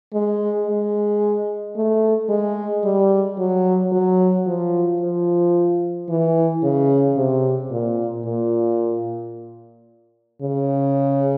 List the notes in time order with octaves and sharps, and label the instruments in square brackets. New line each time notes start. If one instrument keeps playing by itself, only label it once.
[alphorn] G#3
G#3
A3
G#3
G3
F#3
F#3
F3
F3
E3
C#3
C3
A#2
A#2
C#3